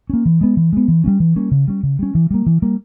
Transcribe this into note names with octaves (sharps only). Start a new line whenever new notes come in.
A#3 C#4
E3
G#3 B3
E3
G#3 B3
E3
G3 A#3 C#4
E3
G3 A#3 C#4
C#3
G3 C#4
C#3
G3 C#4
E3
G3 A#3
E3
G3 A#3